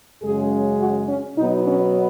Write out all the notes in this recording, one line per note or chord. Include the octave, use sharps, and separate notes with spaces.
F#2 C#3 G#3 G#4
F#4
C#4
B2 F#3 B3 D#4
C#4